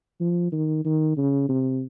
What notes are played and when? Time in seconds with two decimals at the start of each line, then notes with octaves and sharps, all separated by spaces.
0.21 F3
0.53 D#3
0.85 D#3
1.17 C#3
1.49 C3